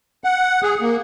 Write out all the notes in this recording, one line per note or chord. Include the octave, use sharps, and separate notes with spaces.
F#5
G#4
A#3